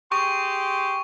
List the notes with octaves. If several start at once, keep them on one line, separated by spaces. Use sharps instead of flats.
G4 G#4 C6 C#6